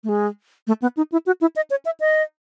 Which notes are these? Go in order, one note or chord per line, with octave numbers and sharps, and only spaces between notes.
A3
G#3
A3
B3
D#4
E4
F#4
E4
D#5
C#5
E5
D#5